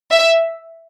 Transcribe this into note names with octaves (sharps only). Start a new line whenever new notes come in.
E5